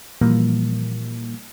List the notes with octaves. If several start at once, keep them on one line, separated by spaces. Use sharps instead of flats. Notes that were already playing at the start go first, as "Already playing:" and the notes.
A#2 E3 F3 G3 A#3